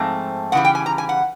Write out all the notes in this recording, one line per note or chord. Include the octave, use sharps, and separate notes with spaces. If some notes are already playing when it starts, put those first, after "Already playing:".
Already playing: G#2 F3 A3 C4
C#3 E3 G3 F#5
G5
G#5
A#5
G#5
F#5